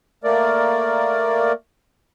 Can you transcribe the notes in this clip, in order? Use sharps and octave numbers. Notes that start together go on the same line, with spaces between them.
A3 A#3 A#4 D5